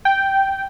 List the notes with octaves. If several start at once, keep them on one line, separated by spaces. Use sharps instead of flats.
G5